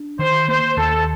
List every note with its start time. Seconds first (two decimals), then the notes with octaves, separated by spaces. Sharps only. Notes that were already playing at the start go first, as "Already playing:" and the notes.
Already playing: D4
0.19 D#3 C5
0.48 A#3 C5
0.77 D#2 A4